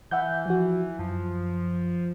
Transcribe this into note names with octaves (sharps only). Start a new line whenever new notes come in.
E3 E5 F#5 G6
F3 F#4
F#2 F3